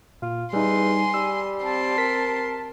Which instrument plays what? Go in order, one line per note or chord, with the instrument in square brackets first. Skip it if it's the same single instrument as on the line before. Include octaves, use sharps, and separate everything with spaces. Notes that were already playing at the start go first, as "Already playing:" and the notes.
[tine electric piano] A#2 [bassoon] F4
[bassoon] E2 [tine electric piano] G3 D#4 [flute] G#5 [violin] C6
[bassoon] G3 [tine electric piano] E6
[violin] C4 C6 [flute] A5
[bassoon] A#4 [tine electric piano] B6